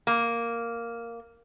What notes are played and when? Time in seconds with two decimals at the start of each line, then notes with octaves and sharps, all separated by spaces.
0.07 A#3